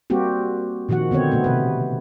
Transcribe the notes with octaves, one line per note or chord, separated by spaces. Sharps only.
G3 A#3 C4 F#4 G4
A#2 D#3 F3 F#4 F#5
D3 B3 C4 C#5
B2 A3 B3
C3 B4